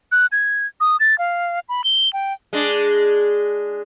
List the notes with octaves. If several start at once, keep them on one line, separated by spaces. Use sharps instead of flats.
F#6
G#6
D#6
A6
F5
B5
G7
G5
G#3 D4